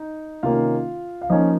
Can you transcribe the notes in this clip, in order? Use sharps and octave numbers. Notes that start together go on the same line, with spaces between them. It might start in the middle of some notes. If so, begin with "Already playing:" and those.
Already playing: D#4
C3 D#3 A#3 C#4 F4 F5
F5
F3 A#3 C#4 D#4 D#5